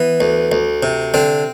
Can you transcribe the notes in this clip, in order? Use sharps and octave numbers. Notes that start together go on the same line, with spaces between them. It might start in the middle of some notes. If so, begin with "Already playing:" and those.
Already playing: E3 B3
D2
D2
C3
D3 C4